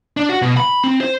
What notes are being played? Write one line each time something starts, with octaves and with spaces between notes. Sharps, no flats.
D4
F#4
B2
B5
C4
C5